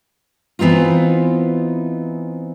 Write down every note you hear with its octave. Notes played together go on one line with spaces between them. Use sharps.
E3 B3 C4 D#4 F4